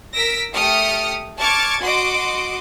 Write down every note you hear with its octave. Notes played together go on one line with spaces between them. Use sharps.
A#4 E6 A#6 B6 D7
A3 G4 D#6 F6 C#7
A5 C#6 D6 F6 G#6 A6
F#4 D#5 C6 D6